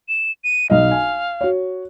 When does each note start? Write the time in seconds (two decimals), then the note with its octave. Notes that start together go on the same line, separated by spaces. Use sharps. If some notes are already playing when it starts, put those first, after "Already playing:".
0.09 E7
0.44 D#7
0.70 B1 D#5 F5
0.91 G#5
1.41 F#4 C#5